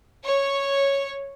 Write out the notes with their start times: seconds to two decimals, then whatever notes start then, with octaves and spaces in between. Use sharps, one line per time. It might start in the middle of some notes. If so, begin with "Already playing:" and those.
0.24 C#5